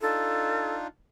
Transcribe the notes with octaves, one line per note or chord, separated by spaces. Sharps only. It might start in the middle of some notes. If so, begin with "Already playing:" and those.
D4 D#4 F4 A4